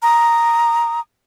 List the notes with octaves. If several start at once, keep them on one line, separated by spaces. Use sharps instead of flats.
A#5 D#6